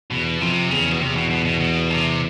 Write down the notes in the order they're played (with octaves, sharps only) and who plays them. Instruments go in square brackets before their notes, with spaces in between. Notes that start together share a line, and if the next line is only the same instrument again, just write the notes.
[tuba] E2 [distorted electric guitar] B2
[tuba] F2 [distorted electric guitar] C3
[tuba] E2 [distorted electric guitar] C#3
[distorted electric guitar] B2
[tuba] E2 [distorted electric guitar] C3
[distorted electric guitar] B2
B2
B2
B2
C3